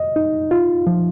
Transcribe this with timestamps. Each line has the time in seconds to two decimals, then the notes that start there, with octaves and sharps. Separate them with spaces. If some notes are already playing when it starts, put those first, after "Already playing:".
Already playing: D#5
0.16 D#4
0.51 F4
0.87 F3